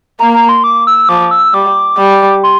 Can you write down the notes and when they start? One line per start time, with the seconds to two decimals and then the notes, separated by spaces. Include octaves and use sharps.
0.20 A#3 A#5
0.34 A#5
0.49 C6
0.64 D6
0.87 E6
1.09 F3 D6
1.31 E6
1.53 G3 D6
1.98 G3
2.43 C6